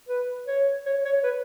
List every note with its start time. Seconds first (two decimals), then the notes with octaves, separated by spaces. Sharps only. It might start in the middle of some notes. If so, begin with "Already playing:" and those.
0.08 B4
0.47 C#5
0.86 C#5
1.05 C#5
1.23 B4